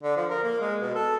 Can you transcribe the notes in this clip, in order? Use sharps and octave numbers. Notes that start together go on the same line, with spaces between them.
D3
F3
A#4
A#3
G#3
B2
A4